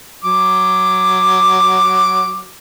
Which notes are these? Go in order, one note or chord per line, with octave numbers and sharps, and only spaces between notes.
F#3 D6